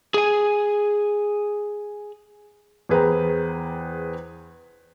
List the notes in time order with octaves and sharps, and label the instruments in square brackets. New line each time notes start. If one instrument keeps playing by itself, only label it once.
[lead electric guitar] G#4 G#5
[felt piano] E2 G#4 B4 C5 G5 A#5